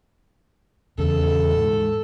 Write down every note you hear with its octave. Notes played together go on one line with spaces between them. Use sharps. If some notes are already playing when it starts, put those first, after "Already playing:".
D#1 E2 C#3 A4
G#2